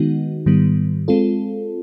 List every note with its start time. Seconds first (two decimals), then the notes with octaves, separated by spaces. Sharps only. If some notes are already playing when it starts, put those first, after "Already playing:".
Already playing: D#3 G#3 B3 D#4 F#4
0.46 G#2 D#3 G3 B3
1.08 G#3 C4 F4 A4